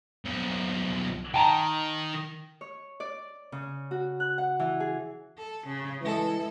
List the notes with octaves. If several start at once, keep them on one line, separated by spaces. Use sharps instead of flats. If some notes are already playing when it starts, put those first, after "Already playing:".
B1 F3
D#3 G5 A5 A#5
C#5
D5
C#3
F#4
F#6
F#5
E3
G#4
A4
C#3
E3 G#3 A4